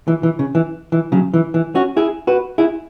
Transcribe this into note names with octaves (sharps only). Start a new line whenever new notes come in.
E3
E3
C#3
E3
E3
C#3 F#3
E3
E3
C#4 F#4
E4 G#4
F#4 B4
E4 G#4